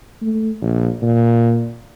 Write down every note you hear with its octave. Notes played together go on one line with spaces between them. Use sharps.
A3
A#1
A#2